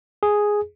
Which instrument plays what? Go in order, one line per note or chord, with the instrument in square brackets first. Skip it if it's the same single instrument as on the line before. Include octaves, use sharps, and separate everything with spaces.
[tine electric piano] G#4